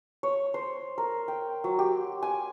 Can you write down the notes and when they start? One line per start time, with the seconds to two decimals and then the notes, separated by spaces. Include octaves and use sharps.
0.23 C#5
0.54 C5
0.98 A#4
1.28 G5
1.64 F#3
1.79 G4
2.23 G#5